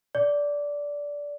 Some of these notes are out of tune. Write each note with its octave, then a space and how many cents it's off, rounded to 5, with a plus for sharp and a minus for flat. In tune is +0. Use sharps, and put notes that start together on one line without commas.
D5 -15